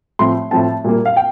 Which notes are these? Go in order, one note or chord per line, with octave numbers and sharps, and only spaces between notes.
A2 F3 C4 C6
A2 F3 C4 A5
A#2 G3 A#3
F5
G5